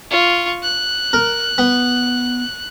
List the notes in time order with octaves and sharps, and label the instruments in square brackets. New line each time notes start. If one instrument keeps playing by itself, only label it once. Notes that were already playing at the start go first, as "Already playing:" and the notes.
[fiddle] F4 C#6
F#6
[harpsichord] A#4
B3